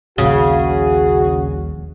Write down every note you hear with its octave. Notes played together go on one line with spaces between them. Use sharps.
D#1 A#1 C#3 F#4 G#4